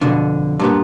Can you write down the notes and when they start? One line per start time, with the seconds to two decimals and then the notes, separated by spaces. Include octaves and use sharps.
0.01 F2 B2 D3
0.59 G2 A#2 B3